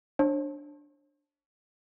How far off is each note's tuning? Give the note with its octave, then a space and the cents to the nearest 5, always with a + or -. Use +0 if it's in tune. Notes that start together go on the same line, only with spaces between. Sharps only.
D4 +0 C#5 -45